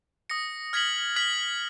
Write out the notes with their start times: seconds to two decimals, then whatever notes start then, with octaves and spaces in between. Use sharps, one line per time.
0.30 D#6 A#6 C#7
0.73 F6 G#6 B6 F#7
1.16 F6 G#6 B6 F#7